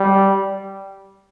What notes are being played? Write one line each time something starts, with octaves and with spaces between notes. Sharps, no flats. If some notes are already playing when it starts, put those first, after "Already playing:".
Already playing: G3